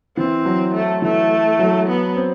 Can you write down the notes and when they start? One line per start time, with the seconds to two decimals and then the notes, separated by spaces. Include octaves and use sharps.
0.17 E3 C4
0.45 F#3
0.74 A3
1.02 E3 A3
1.59 F#3
1.88 B3
2.16 C4